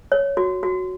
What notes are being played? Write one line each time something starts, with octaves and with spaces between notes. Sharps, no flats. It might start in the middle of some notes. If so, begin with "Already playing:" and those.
C#5
F#4
F#4